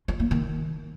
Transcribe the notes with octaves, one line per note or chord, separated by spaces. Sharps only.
F4
A#3
D#3